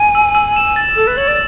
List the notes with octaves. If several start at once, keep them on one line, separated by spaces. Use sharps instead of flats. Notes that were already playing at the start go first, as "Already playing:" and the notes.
Already playing: G#5
E6
E6
E7
A6
A4 E6
B4
C#5 F#7
D5